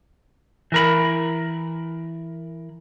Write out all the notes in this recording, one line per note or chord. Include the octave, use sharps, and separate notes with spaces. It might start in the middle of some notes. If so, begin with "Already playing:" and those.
E3 A#4 B5